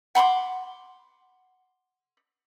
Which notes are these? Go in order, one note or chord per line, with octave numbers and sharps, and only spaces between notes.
F#5 B5 C6 D6